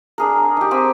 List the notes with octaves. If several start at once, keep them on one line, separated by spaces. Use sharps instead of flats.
D4 G#4 A#4
D#4 G4
C4 G4 G#5 E6